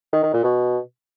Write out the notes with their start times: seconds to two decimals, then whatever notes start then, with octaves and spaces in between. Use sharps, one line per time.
0.13 D#3
0.23 D#3
0.34 A#2
0.44 B2